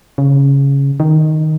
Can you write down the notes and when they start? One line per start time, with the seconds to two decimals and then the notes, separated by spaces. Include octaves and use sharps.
0.18 C#3
1.00 D#3